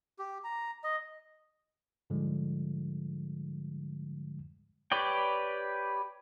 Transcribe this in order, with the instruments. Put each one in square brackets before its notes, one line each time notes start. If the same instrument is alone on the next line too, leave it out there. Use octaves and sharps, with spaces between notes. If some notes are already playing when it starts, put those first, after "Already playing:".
[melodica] G4
A#5
D#5
[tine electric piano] G#2 D3 F3 G3 G#3
[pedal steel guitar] G4 B4 C#5 D5 G5